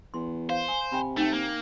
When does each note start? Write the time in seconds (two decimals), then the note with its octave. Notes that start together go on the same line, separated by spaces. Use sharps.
0.14 E2 C6
0.49 C5 F5
0.68 G#5
0.92 C3 G5 G#5 B5
1.17 A3 D#4 G5
1.34 A#3